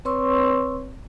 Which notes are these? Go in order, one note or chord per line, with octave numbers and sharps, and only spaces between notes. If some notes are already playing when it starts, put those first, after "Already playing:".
C4 B4 C#5 C6 C#6 E6